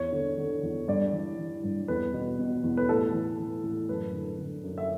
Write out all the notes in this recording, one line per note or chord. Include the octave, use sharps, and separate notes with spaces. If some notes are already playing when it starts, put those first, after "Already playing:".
Already playing: E2 C#5
D3
D3
E2
G2 D5
E3
E3
G2
E2 B4
B2
B2
E2
B4
A2 A4
E3
E3
A2
F#2 B4
D3
D3
F#2
E5